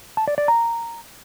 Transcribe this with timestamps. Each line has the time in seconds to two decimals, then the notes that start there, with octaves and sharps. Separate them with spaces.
0.17 A5
0.28 D5
0.38 D5
0.48 A#5